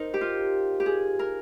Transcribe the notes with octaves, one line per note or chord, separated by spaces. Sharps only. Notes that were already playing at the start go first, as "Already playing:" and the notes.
Already playing: D#4 A#4 C5
G4
F4
G4
G#4
A#4